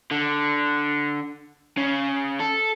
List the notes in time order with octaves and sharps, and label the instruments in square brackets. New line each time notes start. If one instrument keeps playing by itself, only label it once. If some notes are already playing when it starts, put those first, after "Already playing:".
[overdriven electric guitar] D3
C#3
A4